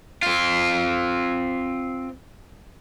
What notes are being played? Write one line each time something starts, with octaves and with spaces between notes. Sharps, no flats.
C4 F4